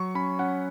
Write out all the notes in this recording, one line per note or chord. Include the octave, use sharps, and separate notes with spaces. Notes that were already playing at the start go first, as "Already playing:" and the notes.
Already playing: F#3 C#6
C#4 B5
C#4 F#5